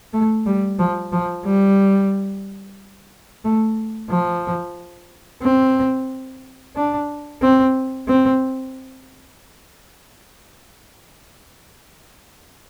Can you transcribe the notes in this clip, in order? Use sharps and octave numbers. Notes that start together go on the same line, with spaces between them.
A3
G3
F3
F3
G3
A3
F3
C4
D4
C4
C4